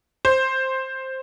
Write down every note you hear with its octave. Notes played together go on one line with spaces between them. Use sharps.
C5